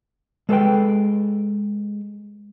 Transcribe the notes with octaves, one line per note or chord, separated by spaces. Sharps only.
G#3 A4 B4 G5